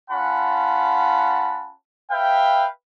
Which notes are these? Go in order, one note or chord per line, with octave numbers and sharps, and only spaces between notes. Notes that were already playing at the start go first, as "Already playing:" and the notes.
C#4 F4 F#5 A5 B5
B4 E5 F5 G5